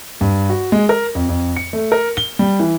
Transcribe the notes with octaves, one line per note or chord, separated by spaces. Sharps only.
G2
F#4
G#3
A#4
F2
F2
C#7
A3
A#4
G7
G3
E3